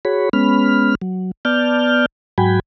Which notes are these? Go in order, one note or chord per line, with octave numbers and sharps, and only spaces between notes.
F#4 G#4 C#5 B5
G#3 B3 C#4 B5 F6
F#3
B3 D5 A5 F6 G6
G#2 F#3 F#4 G5 G#5 B5